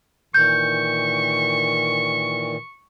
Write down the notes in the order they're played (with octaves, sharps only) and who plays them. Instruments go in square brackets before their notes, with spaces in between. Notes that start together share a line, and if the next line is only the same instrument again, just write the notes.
[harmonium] A#2 D#3 E3 [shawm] C#6 [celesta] G6